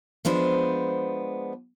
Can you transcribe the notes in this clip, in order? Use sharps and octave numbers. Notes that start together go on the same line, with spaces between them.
F3 G#3 B3 D4 C5